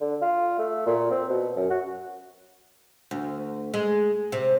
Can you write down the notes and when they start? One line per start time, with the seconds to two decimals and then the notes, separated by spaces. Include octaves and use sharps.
0.01 D3
0.22 F4
0.59 A3
0.86 A#2
1.11 C4
1.29 B2
1.56 F#2
1.70 F#4
3.11 D2
3.74 G#3
4.32 C3